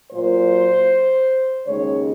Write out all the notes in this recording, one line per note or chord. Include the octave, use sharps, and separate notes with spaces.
A#2 F#3 A#3 C5
D#2 C#3 G#3 D#4 C#5